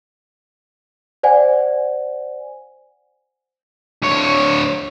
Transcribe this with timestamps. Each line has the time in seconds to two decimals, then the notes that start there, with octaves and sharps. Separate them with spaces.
1.23 C5 D5 F#5 G#5
4.02 D2 C#5